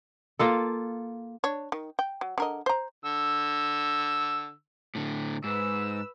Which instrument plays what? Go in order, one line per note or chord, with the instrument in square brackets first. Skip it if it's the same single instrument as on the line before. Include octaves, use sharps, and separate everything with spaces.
[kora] A#3 F4 A4
[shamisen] D4 C#5
D#3
G5
F#3
D3 A#4 D#5
C5 A#5
[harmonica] D3 E6
[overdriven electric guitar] A2 D3
[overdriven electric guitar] G#2 [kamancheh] B4 E6